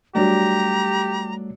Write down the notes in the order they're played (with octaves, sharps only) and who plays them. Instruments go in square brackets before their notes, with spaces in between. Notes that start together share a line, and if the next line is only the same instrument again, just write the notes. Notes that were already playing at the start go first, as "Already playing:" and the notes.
[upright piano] F#3 D4 [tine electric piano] G3 A3 [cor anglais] G4 [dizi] A#5